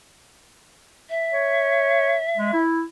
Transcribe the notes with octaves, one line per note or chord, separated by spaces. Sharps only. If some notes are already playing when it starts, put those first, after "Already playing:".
E5
C#5
G#3
E4